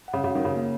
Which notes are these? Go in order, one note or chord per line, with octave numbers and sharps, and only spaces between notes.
F#5
C#3
C#3 F#4
D#3
A#4
C#3
A#3